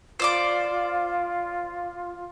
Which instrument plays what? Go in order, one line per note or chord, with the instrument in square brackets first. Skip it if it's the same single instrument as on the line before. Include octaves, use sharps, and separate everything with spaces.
[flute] F4 [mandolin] C5 D5 D6